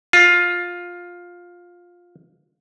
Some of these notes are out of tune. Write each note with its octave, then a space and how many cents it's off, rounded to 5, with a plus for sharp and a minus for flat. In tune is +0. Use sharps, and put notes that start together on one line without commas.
F4 +10